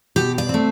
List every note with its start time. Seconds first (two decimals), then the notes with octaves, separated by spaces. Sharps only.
0.16 B2 G4
0.38 D5
0.49 A3 C4